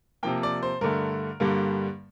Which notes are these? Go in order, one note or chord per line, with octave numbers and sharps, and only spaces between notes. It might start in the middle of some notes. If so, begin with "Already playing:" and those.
C3 F3 A#3 G5
D5
C5
G2 D3 A3 A#4
G2 D3 G3 A#3